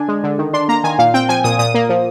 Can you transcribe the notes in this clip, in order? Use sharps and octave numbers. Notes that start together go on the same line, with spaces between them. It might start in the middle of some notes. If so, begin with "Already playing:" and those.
Already playing: D3 D4 G#5
G#3
D3
D#3
D4 C6
A#3 A#5
D#3 G#5
A#2 F5
C4 G5
F3 G#5
A#2 D#6
A#2 D#6
A#3
F3